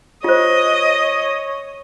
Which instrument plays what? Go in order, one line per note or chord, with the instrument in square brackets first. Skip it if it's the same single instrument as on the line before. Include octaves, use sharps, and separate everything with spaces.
[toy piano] F4 C5 [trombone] C#5 [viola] D#5